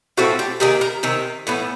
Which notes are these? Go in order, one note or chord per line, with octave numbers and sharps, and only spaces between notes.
A2 F3 A3 C4 F#4
G4
C3 D#3 A#3 G#4
A#4
C3 D#3
A2 E3 B3